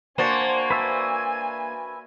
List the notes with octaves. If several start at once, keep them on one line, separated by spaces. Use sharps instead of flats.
A#3 D4 F#4 C5 G#5
B4 E5 A5